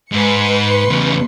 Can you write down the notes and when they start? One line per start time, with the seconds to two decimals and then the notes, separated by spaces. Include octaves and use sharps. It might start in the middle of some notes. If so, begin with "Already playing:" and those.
0.12 G#2 B4 C6 C#7
0.89 E2 C#3